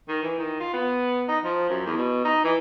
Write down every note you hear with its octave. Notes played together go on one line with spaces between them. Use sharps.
D#3
E3
D#3
F4
B3
D#4
F3
F#2
E2
B2
D#4
E3